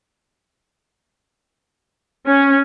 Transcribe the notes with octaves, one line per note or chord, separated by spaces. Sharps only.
C#4